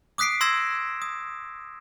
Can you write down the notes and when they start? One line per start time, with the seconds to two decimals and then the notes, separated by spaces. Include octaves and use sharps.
0.18 D6 D#6 F#6 B6 C7 D7
0.41 C6 E6 G#6 A#6 E7
1.02 D#6